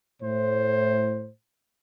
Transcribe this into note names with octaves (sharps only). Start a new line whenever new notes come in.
A2 C5